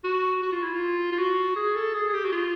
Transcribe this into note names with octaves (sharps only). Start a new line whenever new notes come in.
F#4
F#4
F4
E4
F4
F4
F#4
G#4
A4
G#4
G#4
G4
F#4
F4